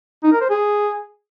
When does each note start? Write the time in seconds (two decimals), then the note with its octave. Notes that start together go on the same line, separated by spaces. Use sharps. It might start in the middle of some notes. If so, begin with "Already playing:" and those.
0.24 D#4
0.32 A#4
0.41 C5
0.50 G#4